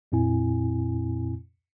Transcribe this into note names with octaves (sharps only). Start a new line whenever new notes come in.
F2 A#2 C4 E4 G#5